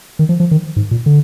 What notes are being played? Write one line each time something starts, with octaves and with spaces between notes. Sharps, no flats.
D#3
F3
F3
D#3
G#2
A#2
D3